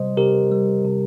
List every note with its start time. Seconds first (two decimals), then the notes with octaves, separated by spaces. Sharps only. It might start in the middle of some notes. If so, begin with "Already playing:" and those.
Already playing: C3 G3 C5 D#5
0.17 C3 G4 A#4
0.52 G3
0.84 C3